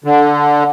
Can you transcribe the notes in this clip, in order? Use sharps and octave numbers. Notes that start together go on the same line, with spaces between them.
D3